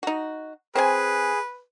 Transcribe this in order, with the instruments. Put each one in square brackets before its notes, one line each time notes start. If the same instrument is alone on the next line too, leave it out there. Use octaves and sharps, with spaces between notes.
[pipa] D#4 F#4
[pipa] C4 C5 G#5 [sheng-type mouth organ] G#4 [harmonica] B4